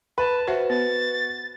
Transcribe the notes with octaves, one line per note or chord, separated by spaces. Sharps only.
B4 A5
F#4 B4 C5 E5
B3 A6